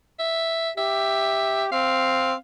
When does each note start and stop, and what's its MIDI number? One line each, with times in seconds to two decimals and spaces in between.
0.19 0.71 76
0.78 1.71 67
0.78 1.65 76
1.72 2.34 60
1.72 2.34 77